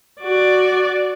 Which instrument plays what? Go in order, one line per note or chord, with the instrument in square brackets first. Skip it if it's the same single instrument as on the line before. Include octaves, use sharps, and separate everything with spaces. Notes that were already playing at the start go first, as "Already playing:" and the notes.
[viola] F#4 D5